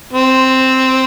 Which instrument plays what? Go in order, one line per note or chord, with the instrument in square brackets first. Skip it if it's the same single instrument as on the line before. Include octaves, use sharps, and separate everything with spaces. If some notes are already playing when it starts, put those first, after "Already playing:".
[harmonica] C4